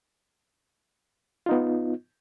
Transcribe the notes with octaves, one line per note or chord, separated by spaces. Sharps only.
B3 D#4 F4